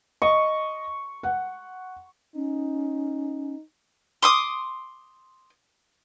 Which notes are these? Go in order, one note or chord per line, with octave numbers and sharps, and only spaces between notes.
D#5 C#6
F#5
C#4 D#4
C6 D6 D#6